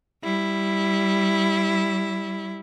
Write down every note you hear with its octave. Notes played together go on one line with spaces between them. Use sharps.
G3 E4